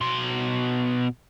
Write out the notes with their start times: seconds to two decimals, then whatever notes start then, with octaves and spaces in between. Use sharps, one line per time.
0.01 B2 C6